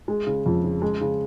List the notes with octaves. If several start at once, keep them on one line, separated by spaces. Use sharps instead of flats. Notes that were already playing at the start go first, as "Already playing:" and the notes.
G#3
C#3
F2
C#3
G#3
C#3